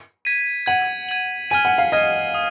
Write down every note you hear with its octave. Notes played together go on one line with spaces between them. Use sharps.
G#6 B6 D#7
F#5 G#6 D#7 F#7
G#6 D#7 F#7
G#5 F6 G#6 D#7
F#5
F5
D#5 F6 G#6 D#7
D#6